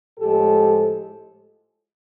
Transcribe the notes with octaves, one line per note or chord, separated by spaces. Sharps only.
A2 F3 G#3 G4 A4